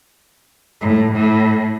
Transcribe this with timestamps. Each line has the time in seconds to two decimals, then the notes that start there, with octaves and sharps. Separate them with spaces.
0.82 A2
1.13 A2